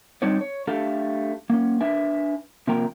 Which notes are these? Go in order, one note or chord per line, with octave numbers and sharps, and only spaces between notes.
G3 C4 D4 D#4 C#5 D5
C#5
A3 D4 G4 A4 F5
A#3 C#4
D4 B4 E5 G#5
C3 F3 A#3 A#4 G5 A#5